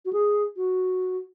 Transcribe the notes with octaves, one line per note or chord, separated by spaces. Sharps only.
F#4
G#4
F#4